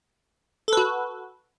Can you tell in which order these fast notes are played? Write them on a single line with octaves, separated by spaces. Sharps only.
A4 B4 F#4